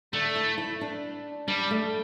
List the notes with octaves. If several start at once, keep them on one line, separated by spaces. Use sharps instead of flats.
D3 A3
E4
E4
D4
G3 D4
A3